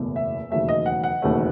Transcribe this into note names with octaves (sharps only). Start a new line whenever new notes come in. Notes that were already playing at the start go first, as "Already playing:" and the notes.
Already playing: F#1 E2 B2 A3
E5
E1 D#2 C#3 F#3 A3 E5
D#5
F#5
F#5
E1 D#2 C#3 F#3 A3